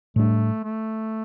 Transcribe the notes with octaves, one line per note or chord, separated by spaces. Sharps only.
A2 G3 A3 D4
A3